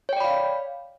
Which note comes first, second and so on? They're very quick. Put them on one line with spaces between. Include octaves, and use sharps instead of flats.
C#5 G5 D5 B5 F5